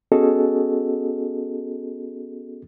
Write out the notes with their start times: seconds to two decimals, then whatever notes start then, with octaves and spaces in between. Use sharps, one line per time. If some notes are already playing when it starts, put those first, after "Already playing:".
0.12 B3 C#4 F#4 G#4 A4 D#5